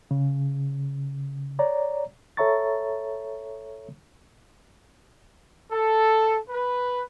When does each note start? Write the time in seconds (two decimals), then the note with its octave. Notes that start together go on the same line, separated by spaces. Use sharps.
0.11 C#3
1.59 C#5 D5 A#5
2.37 A4 C#5 E5 A#5 C#6 A6
5.71 A4
6.49 B4